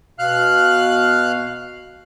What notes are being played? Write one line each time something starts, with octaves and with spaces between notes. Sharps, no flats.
B2 F5 F6 F#6